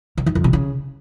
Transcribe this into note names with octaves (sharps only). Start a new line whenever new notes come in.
C#3
D#3
F2
C3
C#3